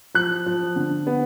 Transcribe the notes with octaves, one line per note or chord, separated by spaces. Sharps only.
F3 F#6
F3
D3
B3